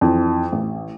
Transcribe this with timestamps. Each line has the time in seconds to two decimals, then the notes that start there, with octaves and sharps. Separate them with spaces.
0.01 F2 E3
0.52 A1